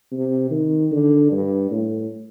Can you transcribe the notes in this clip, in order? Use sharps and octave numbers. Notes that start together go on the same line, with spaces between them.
C3
D#3
D3
G2
A2